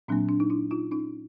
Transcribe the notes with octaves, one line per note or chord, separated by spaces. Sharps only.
A#2 F#3 A#3 C4 D4
D4
D#4
D4 E4
D#4 F4
C#4 D#4